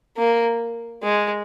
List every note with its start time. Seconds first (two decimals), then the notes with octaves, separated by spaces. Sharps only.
0.17 A#3
1.03 G#3